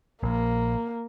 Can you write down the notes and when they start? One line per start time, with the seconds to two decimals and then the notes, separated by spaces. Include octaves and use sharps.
0.23 A#1 A#3